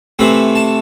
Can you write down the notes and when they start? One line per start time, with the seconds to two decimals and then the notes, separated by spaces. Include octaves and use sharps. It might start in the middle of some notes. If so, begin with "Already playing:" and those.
0.19 C3 E3 A3 C4 B5
0.55 A5